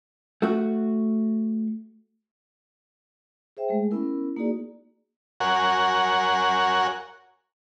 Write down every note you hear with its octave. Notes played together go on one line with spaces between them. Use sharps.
A3 F#4
G#4 C5 E5 G5
G#3 A3 G#4
B3 C#4 E4 A#4
A#3 D#4 F#4 G#4 D5
F#4 A#4 C#5 F#5 G#5